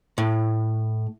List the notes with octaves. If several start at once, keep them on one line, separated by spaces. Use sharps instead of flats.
A2